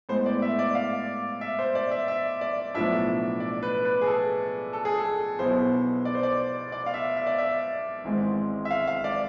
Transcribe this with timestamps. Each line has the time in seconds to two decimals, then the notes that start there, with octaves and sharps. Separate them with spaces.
0.09 A2 G#3 B3 C5
0.26 D5
0.42 E5
0.59 D5
0.75 F5
1.41 E5
1.59 C5
1.75 D5
1.91 E5
2.08 E5
2.41 D5
2.74 B1 A2 F3 B3 D4 E5
3.40 D5
3.63 B4
3.85 B4
4.01 G#4
4.07 A4
4.73 A4
4.85 G#4
4.98 A4
5.39 B1 B2 B3 E4 C5
6.05 D5
6.15 C5
6.23 D5
6.72 D5
6.86 F5
6.94 E5
7.16 E5
7.27 D5
7.38 E5
8.04 G#1 G#2 E3 G#3 C4
8.65 E5
8.71 F5
8.87 F5
9.04 D5